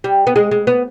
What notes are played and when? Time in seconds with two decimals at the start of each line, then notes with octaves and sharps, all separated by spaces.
0.04 G3
0.27 B3
0.36 G#3
0.51 G#3
0.67 B3